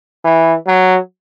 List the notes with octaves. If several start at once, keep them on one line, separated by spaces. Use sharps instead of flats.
E3
F#3